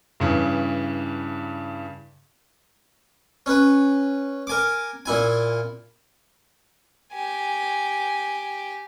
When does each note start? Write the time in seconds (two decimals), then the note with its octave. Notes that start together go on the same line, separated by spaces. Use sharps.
0.20 G2 C#3 E3
3.46 C#4 B4
4.47 A#4 G#5 D6
5.06 A#2 E4 G#5
7.13 G4 G#5